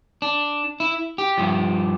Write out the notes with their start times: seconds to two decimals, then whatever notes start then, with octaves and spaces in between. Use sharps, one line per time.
0.22 D4
0.80 E4
1.18 G4
1.38 G2 F3